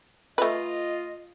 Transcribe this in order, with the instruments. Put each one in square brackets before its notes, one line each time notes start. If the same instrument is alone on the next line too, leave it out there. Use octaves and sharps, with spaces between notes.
[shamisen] A3 B4 [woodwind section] F4 D#5